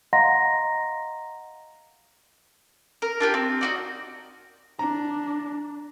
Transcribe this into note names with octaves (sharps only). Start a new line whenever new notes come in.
D#5 F5 F#5 A#5 C6 A#6
A#4
D4 F4 G4 A#4
C4
D#4 F#4 D5
D4 A#5